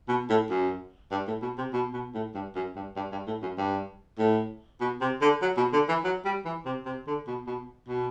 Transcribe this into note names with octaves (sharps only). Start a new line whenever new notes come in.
B2
A2
F#2
G2
A2
B2
C3
B2
B2
A2
G2
F#2
G2
G2
G2
A2
F#2
G2
A2
B2
C3
D3
F#3
B2
D3
E3
F#3
G3
E3
C3
C3
D3
B2
B2
B2